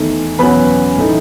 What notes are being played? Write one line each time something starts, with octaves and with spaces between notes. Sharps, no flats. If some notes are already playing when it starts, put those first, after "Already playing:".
Already playing: E2 D#3 A3 D#4
E2 B2 F#3 C#4 B4 B5
A2 E3 A3 D#4